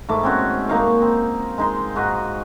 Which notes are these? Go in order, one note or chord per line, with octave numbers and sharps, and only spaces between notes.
G#2 A3 D6
C4 C#4 F#4
A#3 D#4 F5 C#6
C4
G#3 D#4 C6
G#2 F#4 D#5